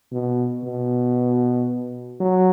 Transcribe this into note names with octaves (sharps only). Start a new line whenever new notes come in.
B2
B2
F#3